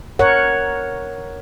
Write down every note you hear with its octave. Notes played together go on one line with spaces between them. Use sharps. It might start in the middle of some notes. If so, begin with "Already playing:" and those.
A#4 C#5 F#5